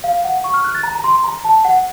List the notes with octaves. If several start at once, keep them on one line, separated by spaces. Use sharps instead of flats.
F5
F#5
C#6
F6
F#6
A6
A#5
A#5
C6
A#5
A5
F#5